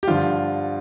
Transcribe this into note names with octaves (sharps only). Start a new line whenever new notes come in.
G4
G2 D3 F3 F4